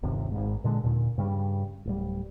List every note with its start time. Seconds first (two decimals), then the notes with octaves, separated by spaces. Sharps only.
0.03 G1 D#2 C3
0.31 G#1 G#2
0.64 A#2 D3 G3 G#3
0.83 D#2 A#2 D3
1.18 G2 C#3 G3
1.85 D1 G3